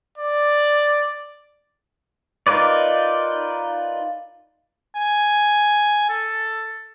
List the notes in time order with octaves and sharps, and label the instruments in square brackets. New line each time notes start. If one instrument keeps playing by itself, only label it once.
[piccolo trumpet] D5
[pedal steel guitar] D#4 F4 A#4 B4 D5
[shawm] G#5
A4